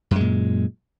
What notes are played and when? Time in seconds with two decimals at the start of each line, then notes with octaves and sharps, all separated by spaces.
0.11 F#2
0.16 G#3
0.20 A#2